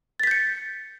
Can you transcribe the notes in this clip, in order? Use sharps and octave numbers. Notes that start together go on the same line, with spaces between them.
G6 A6 B6 C#7